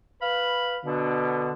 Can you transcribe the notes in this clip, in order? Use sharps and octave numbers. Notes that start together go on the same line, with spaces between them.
B4 F5 B5
B2 D3